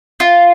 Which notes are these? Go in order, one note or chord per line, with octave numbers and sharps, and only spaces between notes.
F4